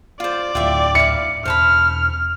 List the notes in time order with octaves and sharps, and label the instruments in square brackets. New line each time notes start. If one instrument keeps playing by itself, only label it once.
[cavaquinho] F4 C5 [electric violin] D5
[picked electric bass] D1 A2 [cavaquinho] F4 G4 E5
[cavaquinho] E4 F5 [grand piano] C#7
[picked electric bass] E1 [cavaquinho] C5 A5 B5 [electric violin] F6